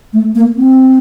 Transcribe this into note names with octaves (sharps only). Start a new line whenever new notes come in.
A3
A#3
C4